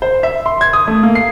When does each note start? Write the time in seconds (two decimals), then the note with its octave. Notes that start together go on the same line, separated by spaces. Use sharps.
0.02 C5
0.23 E5
0.46 C6
0.61 G#6
0.73 D#6
0.87 A3
1.03 A#3
1.15 C7